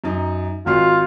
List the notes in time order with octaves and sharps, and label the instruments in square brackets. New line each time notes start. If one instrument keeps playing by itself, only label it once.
[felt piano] F#2 D#4
[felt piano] G#1 F#4 C7 [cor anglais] F4